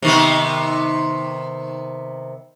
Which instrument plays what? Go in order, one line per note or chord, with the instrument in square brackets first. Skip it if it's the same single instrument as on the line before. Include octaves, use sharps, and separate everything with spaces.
[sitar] C3 D#3 B3